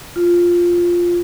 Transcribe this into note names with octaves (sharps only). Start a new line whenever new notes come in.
F4